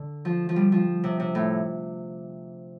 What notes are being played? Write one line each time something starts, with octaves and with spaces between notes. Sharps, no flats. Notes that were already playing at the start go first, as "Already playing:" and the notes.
Already playing: D3
F3
F3
G3
F3
C3
C3
A2